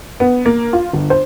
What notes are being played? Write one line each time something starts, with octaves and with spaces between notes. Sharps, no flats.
B3
A#3
F4
G1
C5